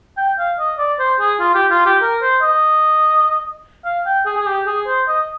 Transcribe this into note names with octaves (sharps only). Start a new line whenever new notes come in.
G5
F5
D#5
D5
C5
G#4
F4
G4
F4
G4
A#4
C5
D#5
F5
G5
G#4
G#4
G4
G#4
C5
D#5